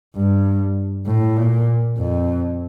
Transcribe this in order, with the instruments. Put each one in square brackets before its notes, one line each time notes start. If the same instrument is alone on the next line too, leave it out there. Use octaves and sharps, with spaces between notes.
[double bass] G2
A2
A#2
F2